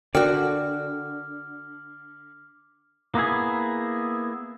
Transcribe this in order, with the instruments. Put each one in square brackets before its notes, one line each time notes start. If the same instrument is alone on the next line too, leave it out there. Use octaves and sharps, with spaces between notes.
[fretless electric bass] D3 [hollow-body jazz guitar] F#4 D5 [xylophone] A4 A#4 G5 [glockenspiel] D6 F6
[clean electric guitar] A#3 B3 E4 G#4